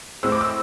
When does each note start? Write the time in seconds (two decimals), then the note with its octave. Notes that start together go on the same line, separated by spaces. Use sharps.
0.23 A2 G#3 C4 E6
0.32 D6
0.41 E6